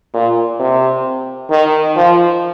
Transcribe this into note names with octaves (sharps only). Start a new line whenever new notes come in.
A#2
C3
D#3
F3